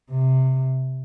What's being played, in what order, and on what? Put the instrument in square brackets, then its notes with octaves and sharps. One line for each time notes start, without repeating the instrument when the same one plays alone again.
[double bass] C3